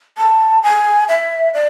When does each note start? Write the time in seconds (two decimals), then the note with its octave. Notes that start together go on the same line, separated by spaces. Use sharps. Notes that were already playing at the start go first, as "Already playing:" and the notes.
0.18 A5
0.63 G#5
1.09 E5
1.54 D5